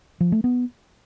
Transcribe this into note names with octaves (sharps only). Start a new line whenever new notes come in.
F3
A3
B3